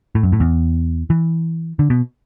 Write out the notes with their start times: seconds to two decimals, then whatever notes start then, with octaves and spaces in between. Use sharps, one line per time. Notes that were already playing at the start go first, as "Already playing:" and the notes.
0.15 A2
0.23 F#2
0.32 A2
0.40 E2
1.10 E3
1.79 D3
1.90 B2